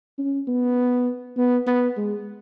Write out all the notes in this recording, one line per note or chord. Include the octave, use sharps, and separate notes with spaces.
C#4
B3
B3
B3
G#3